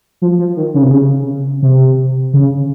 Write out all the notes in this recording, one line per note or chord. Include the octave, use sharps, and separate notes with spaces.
F3
F3
D#3
C#3
C3
C#3
C3
C#3